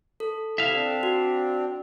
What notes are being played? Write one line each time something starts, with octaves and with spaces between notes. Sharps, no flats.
A4
C3 E4 E5 F5
C4 D4
F#4